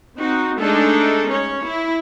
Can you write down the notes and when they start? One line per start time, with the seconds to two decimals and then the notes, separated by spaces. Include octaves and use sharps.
0.17 C4 D#4 F#4
0.60 G#3 A3 D4 D#4 G#4 A4
1.30 C#4 C#5
1.64 E4